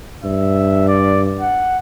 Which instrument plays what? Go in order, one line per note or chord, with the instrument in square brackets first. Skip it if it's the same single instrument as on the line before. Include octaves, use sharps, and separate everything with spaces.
[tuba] G2 [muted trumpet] E5
[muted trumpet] D5
F#5